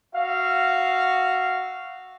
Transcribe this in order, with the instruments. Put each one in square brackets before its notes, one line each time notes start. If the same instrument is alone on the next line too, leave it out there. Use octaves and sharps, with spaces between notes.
[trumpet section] F#4 E5 F5